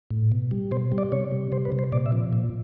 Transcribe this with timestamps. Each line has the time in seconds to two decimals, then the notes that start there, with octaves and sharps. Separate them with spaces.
0.10 A2
0.32 B2
0.51 G3
0.71 B2 C5
0.92 G3
0.98 D5
1.12 C3 C#5
1.32 G3
1.52 C3 C5
1.65 B4
1.72 C3
1.79 C5
1.92 A#2 D5
2.06 E5
2.12 F3
2.33 A#2